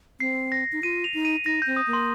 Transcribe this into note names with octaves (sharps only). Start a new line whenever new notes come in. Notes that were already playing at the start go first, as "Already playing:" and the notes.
C4 C7
A#6
D#4
F4 D#7
F7
D#4
D#7
D#4 A#6
C4 G6
D#6
A#3
C6